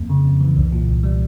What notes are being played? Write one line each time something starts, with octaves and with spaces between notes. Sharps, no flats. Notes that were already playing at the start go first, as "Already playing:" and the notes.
Already playing: F2 A#3
C#3
F2
E3
C2
A#2
C2
G3